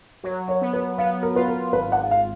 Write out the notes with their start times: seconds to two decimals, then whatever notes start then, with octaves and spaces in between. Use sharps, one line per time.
0.23 F#3 C#5
0.48 C#5
0.62 B3
0.73 B4
0.98 B3 F5
1.23 A#4
1.35 F4 B4
1.48 A#4
1.73 G#1 B4
1.92 F#5
2.11 F5